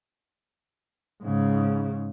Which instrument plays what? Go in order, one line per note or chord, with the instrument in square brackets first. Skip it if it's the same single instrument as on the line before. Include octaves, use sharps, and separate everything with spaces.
[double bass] G#2 C#3